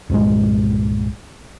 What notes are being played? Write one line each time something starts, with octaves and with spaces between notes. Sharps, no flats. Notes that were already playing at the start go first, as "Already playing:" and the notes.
C2 G2 A#2 G#3